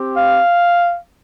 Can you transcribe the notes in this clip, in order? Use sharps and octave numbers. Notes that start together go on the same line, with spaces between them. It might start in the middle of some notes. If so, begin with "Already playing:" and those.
Already playing: C4 G4
F5